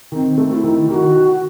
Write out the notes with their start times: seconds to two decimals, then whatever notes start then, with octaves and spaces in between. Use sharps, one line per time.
0.12 D#3 C4
0.38 A3
0.50 F#4
0.54 E4
0.64 D#3
0.88 D#3 G4
0.94 F#4